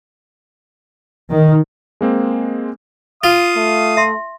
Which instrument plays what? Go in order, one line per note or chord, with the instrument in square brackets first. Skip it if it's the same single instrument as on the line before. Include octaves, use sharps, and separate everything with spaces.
[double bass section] D#3
[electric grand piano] G#3 A#3 C4
[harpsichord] F4 [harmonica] F5 D#6
[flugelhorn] A3
[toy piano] E5 C6